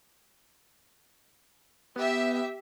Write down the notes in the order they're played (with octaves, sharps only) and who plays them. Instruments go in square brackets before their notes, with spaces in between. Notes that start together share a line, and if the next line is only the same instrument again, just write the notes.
[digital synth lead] B3 [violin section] G4 E5